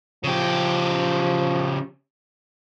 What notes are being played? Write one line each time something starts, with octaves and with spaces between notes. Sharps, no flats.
C#3 F3 G4